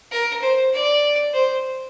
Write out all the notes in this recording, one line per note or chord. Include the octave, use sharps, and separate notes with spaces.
A#4
C5
D5
C5